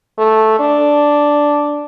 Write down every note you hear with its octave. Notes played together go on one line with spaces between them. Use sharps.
A3
D4